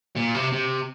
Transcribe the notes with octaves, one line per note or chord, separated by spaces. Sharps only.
A#2
C3
C3